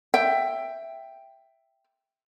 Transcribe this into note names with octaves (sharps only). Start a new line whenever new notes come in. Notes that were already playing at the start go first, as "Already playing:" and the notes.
E5 G5